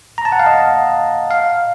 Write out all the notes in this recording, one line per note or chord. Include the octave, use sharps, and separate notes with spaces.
A#5
A5
F#5
F5
D#5
F5